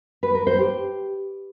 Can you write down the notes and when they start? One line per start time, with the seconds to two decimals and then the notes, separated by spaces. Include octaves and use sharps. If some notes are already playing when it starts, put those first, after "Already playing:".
0.23 B4
0.35 A#4
0.47 C5
0.59 G4